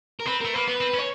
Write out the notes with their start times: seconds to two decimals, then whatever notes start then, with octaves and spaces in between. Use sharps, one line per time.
0.20 A#4
0.26 C4 B4
0.41 A3 A#4
0.54 A#3 B4
0.67 B3 B4
0.81 C4
0.94 C#4
0.98 C#5